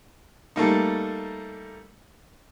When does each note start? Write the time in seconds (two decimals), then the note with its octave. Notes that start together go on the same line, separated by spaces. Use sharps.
0.56 G3 A3 A#3 D#4